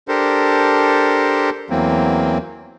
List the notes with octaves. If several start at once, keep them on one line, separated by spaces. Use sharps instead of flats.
D4 G4 A4 A#4 C5
E2 E3 F#3 A#3 C4